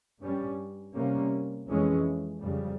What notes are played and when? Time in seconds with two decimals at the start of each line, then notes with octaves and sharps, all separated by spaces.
0.20 G2 G3 C#4
0.94 C3 G3 A#3 C#4
1.68 F2 E3 G#3 C#4
2.41 F2 C#3 G3